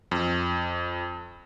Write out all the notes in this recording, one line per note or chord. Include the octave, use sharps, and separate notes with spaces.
F2